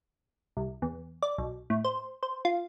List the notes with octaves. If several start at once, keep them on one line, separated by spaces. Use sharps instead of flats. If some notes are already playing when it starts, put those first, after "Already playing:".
C2
E2
D5
B1
A2
C5
C5
F4